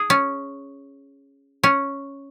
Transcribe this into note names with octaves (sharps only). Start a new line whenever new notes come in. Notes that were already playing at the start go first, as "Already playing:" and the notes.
Already playing: G#4
C#4
C#4